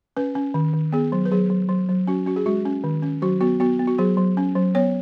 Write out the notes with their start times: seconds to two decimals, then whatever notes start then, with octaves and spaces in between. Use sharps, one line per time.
0.17 C#4 B4
0.35 C#4
0.54 D#3
0.74 D#3
0.92 B3 G#4
1.12 F#3
1.25 B4
1.32 F#3 G#4
1.50 F#3
1.69 F#3
1.89 F#3
2.07 C#4 F#4
2.26 C#4 F#4
2.36 G#4
2.46 G#3 F#4
2.65 C#4
2.84 D#3
3.02 C#4
3.22 F#3 F#4
3.41 B3 F#4
3.60 B3 F#4
3.79 B3
3.87 F#4
3.98 F#3 G#4
4.17 F#3
4.37 C#4
4.55 F#3
4.75 B3 C#5